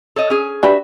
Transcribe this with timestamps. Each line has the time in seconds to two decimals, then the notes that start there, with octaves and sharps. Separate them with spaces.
0.16 A4 C#5 D#5
0.30 C#4 G#4
0.63 D4 F#4 G4 B4 E5